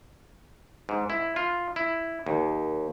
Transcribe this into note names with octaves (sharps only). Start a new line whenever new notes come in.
G#2
E4
F4
E4
D#2